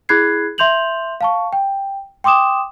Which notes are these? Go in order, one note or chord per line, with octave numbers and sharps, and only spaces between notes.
E4 G#4 B5 F#6 G#6 C7
E5 C6 G6 F7 F#7
F5 A5 C#6
G5
G5 C6 D6 D#6 E7